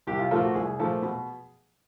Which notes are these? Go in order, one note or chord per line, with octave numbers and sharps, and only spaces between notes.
C2 G4
F4
A#2 F3 A3 F4
F#4
C2 G#4
A#2 F3 A3
B2